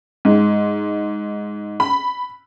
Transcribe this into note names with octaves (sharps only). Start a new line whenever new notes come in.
G#2
B5